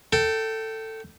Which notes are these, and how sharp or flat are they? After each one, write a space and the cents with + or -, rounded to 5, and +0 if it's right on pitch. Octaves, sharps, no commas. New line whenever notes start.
A4 +15 G5 -15